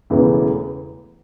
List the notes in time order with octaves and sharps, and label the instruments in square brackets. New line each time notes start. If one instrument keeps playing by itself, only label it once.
[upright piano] E1 E2 C#3 E3 A3